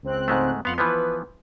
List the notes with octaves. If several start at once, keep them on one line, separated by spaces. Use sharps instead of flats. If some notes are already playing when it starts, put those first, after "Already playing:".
C#2 C4 F#6
G#2 G#3 A3
F2 B3 F5 F#5 C6
E3 F3 B3 B4